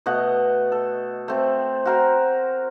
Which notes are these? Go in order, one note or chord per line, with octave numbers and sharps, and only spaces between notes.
B2 A3 D#5 F#5
A4
A3 C4
F#4 A#4 C5